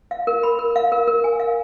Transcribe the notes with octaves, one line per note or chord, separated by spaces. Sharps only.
F5
A#4
B5
A#4
F5
A#4
A#4
G#5
F5